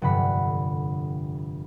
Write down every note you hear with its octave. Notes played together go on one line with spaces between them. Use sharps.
F1 G2 D3 F#5 B5 B6